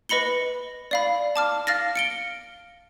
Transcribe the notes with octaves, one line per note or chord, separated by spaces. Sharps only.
B4 D#5 B5 C#7 G7
D5 F5 B5
A5 D6 F6
F5 F6 A6 A#6
C#7 D7 G7